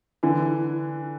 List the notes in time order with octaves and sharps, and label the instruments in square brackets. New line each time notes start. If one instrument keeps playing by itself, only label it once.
[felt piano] D3 E3